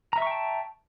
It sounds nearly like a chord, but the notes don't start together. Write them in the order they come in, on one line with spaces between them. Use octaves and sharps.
A#5 E5 C#6 G5 A5